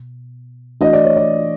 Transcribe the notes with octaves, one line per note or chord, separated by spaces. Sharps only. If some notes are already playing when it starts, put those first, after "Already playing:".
Already playing: B2
E3 A3 D4 F#4 D#5
D5
C#5
D5